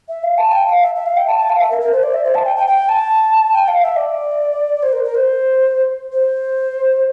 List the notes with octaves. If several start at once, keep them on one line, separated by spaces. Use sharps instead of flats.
E5
F5
A5
G5
F5
E5
E5
F5
G5
A5
A5
F5
E5
A#4
A#4
C5
D5
E5
C5
A5
G5
G5
G5
A5
G5
F5
E5
D5
C5
A#4
A#4
C5
C5